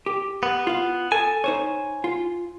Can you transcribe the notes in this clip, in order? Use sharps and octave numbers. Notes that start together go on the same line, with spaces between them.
G4
B3
F4 F5
A4 G#5
D#4 C5 C#5
F4